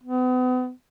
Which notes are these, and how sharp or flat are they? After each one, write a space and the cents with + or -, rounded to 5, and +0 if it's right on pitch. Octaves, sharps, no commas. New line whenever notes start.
B3 +40